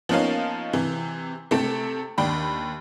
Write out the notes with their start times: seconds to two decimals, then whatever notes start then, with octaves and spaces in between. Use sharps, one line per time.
0.09 F3 A#3 B3 C#4 D#4 F5
0.73 C3 E3
1.51 C3 A3 C4 A5
2.18 D#2 D4 G5 B5